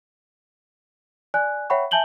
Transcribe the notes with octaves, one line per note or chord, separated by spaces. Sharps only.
D5 G#5 F#6
C#5 E5 F#5 G5 B5 C#6
E5 G#5 A5 G6 F#7 G7